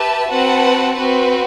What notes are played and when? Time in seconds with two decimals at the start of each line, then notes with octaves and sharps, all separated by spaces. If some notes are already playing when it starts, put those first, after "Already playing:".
Already playing: G4 B4 E5 A5
0.29 C4 F#4 B4 F#5 A5
0.98 C4 F#4 B4